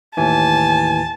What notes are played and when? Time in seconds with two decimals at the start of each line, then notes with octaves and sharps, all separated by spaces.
0.17 D#2 A2 E3 G#5 A5